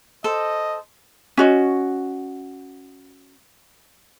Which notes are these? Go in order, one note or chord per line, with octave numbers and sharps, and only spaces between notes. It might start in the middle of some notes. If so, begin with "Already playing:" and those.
A4 C5 D#5
C#4 F#4 D#5